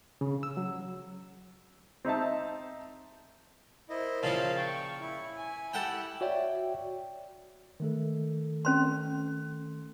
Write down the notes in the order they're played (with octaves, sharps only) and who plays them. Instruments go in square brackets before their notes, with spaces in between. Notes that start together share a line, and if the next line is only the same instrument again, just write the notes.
[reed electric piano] C#3
E6
F#3
[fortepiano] C4 D#4 E5 A5
[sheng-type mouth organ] E4 D#5 [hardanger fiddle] A#4 C5
[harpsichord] A#2 C#3 F3 [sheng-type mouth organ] F5 A5
[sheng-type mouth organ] G5 [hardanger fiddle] C#6
[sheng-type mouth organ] E4
[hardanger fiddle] G#5
[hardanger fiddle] G4 B5 [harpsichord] A4 F#5 G5
[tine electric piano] F#4 C#5 D5 E5 G5
D#3 A3 A4
[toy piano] C#4 C5 C6